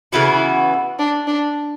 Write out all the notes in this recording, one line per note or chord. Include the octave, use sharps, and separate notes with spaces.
C#3 E3 B3 E4 F#4
D4
D4